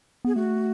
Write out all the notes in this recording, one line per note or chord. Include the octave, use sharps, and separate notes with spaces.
B3 G#4
A3 F#4